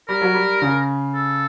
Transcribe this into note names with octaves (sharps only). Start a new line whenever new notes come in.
G3 A#4
F#3
G3
C#3
A4